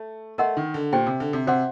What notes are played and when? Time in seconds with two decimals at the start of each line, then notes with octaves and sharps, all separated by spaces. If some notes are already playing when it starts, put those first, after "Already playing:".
Already playing: A3
0.38 A3 A#4 D#5 F#5 C6
0.57 D#3
0.74 D3
0.93 A#2 G4 C5 G5
1.07 C3
1.20 D3
1.33 C3
1.47 C3 F#4 C5 F#5 C6